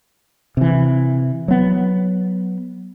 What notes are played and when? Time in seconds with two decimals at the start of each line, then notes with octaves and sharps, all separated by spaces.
0.57 C3 E3
1.48 F#3 B3